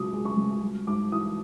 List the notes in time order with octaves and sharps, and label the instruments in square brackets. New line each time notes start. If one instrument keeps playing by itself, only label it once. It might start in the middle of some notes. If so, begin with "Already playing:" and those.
Already playing: [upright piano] C#2 B2 D6 D#6
G#3
C#6
C#2
G3
G#2 D6
E3 D#6